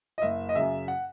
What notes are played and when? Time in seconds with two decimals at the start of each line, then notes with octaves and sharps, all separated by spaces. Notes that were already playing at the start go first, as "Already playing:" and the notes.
0.18 D#5
0.22 F#1 E5
0.49 D#5
0.55 F#2 C#3 E5
0.88 F#5